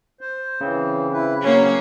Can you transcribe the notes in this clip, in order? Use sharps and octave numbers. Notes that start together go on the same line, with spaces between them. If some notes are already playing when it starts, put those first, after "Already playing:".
C5
C#3 E3 C4
E4 B4
F#3 A#3 C#4